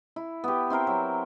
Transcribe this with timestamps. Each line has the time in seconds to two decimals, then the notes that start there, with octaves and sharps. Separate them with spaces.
0.16 E4
0.44 B3 G4
0.70 C4 E4 A#4 C5
0.87 F#3